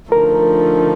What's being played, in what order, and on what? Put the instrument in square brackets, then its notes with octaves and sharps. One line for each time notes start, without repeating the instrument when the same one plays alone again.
[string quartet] D3 F3 A3 D#4 [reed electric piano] A#4